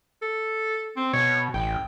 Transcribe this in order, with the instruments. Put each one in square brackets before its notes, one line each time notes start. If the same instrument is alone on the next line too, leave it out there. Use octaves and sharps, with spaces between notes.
[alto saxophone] A4
C4
[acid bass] B2 [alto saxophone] C#5
[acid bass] A1 [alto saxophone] G5